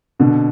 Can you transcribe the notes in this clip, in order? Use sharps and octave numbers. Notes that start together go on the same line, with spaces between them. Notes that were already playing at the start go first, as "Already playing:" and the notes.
B2 D3